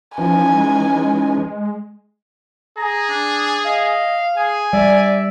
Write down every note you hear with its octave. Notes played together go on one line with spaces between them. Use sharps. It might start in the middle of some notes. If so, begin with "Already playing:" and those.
E3 F3 C#4 D#4 G#5
G#3
G#4 A#5
D4
D#5 F5
G#4 G#5
G3 D5 E5